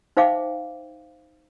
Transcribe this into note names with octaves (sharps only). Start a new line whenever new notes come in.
D#4 C5 E5 F5 G5 D6